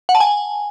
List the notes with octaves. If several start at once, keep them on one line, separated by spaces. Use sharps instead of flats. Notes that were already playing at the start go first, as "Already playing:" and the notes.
F#5
A5
G#5